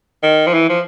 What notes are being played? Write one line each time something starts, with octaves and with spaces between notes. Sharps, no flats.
D#3
F3
E3
F3